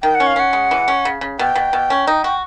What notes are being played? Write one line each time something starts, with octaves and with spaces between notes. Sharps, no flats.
D#3 G5
F#5
C#4
F5
C#4 F#5
G#3
E3
C#4
C#3
C#3
B2 G5
B2
B2
C#4
D#4
F#4